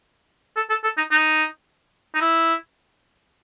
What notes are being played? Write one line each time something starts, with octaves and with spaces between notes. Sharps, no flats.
A4
A4
A4
D#4
D#4
D#4
E4